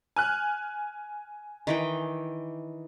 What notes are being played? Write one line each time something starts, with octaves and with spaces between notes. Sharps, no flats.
G#5 F6 F#6
D#3 E3 G5